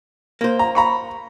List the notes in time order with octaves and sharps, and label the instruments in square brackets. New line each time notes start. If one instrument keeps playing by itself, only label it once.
[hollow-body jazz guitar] A#3 C5
[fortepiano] A#5
A#5 B5 C#6